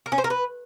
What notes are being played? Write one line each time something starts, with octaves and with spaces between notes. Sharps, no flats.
A#4
C#4
C5
A#4
B4